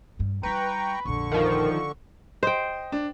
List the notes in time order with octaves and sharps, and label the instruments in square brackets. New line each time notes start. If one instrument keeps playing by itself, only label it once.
[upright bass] G2 G3
[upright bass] G3 E4 [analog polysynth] B4 [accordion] G5 A#5 C#6
[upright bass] A#1 F2 [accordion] D3 C#6
[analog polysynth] D#3 F3 [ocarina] A#4
[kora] C5 G5 [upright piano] D#5
[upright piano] D4